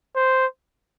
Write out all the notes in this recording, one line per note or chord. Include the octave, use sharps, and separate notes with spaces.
C5